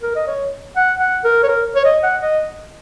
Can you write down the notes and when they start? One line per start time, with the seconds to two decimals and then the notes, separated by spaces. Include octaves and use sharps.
0.03 A#4
0.16 D#5
0.27 C#5
0.76 F#5
1.00 F#5
1.24 A#4
1.43 C#5
1.49 A#4
1.76 C#5
1.85 D#5
2.03 F#5
2.22 D#5